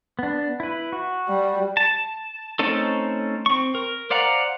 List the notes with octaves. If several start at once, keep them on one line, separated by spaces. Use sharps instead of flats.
B3 D4
E4 B4
F#4
G3
A5
A3 C4 C#4 D#4 A4
C4 C#6
A#4
C5 D5 F5 F#5 A#5